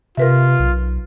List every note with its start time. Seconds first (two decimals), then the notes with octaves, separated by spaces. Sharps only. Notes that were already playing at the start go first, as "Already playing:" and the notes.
0.17 C3 F4 A#4 B4 E5
0.59 B1